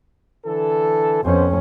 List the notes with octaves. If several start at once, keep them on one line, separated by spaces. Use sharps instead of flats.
D3 E3 A4
F2 B2 C#4 C5